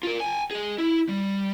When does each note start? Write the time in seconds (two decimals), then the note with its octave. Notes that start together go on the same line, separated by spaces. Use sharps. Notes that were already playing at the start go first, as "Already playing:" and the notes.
0.03 F4 A#4
0.20 G5 G#5
0.51 G#4 D#5
0.78 E4
1.09 G3